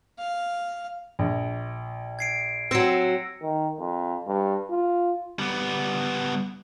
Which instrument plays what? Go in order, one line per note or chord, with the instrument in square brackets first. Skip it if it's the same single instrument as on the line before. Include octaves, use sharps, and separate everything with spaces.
[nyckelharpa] F5
[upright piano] A#1
[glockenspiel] G#6 C7 D7
[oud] F#3 C4 [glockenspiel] E6 A#6 C#7
[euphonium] D#3
F2
G2
F4
[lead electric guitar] G3 B3